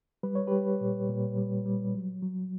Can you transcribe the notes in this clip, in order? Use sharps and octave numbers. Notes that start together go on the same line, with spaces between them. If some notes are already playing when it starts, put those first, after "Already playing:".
G3 B4
C#5
G3 G4 B4
A#2
A#2
G3
G3
F#3
F#3